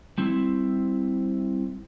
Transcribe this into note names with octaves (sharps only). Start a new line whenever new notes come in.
G3 C4 E4